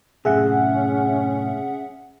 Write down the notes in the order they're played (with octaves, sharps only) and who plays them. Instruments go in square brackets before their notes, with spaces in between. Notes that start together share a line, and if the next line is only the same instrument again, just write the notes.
[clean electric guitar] F#2 A2 C3 [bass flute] C#4 [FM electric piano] G#4 E5 F#5